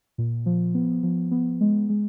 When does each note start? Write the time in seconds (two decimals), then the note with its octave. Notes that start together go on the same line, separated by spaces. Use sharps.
0.18 A#2
0.46 F3
0.74 B3
1.03 F3
1.31 B3
1.61 G#3
1.89 G#3